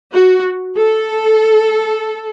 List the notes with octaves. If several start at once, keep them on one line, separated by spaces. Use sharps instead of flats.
F#4
A4